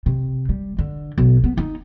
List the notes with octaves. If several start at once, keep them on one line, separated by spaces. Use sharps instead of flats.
C3
G3
D3
B1
B3
D#4